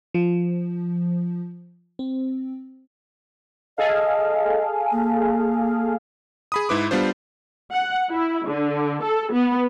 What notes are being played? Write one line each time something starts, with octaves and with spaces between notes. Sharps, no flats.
F3
C4
G#4 A4 D#5 F5
A#3
G#4 B5 D#6
G#2 E4 B4 D6
G3 B3 D4 F4 C5
F#5
E4
D3
A4
B3